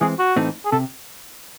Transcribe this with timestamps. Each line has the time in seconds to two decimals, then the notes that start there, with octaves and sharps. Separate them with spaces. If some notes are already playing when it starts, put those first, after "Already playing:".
0.01 E3 G#3 C4 G#4
0.19 F#4
0.36 A2 E3 A3 C4 D#4
0.65 G#4
0.72 C3 A4